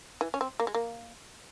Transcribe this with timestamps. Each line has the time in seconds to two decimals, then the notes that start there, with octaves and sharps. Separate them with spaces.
0.21 E3
0.34 C#4
0.41 C4
0.60 A#3
0.67 G#3
0.74 A#3